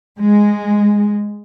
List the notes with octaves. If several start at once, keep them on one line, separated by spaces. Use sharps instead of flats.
G#3